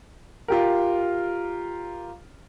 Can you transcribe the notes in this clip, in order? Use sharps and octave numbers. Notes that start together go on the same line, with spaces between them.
F4 G4 A#4